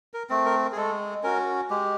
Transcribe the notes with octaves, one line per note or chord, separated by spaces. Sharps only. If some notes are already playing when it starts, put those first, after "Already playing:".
A#4
A3 C4
A#4
G#4
G#3 A4
C#4 F#4 A#4
G#3 G4